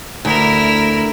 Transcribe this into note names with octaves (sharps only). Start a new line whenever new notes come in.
D2 E4 A#4